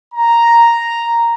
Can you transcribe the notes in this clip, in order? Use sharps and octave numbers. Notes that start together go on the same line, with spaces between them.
A#5